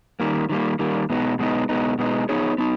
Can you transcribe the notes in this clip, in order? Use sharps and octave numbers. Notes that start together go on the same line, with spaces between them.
D#3 G3 A#3
D#3 G3 A#3
D#3 G3 A#3
B2 G#3 B3 D#4
B2 G#3 B3 D#4
B2 G#3 B3 D#4
B2 G#3 B3 D#4
B3 D#4 G#4 C#5
B3 D#4